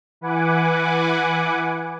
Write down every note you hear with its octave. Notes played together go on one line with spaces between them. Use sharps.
E3 B4 F#5 G#5 D6